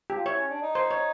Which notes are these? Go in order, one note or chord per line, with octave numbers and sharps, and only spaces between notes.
G4
F4
E4 C#5
C#4
D4
D#4
C5
C#5